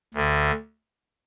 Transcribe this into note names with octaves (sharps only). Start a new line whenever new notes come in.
D2 D3